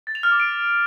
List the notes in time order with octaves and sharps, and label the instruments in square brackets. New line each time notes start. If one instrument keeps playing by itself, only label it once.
[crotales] A6
F7
F6
D6
D7